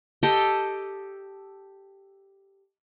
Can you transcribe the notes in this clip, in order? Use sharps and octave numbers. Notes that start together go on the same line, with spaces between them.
G4 A4 D#5 G5